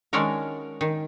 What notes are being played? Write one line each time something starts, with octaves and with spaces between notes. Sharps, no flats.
D#3 G#3 C#4 D4 F#4 A#4
D#3